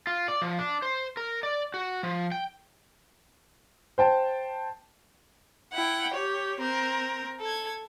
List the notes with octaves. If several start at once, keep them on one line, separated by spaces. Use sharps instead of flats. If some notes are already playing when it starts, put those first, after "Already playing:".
F4
D5
F3
D4
C5
A#4
D5
F#4
F3
G5
C5 G5 A5
E4 F#5 G5
G4 C#5
C4 A#4
A4 G#6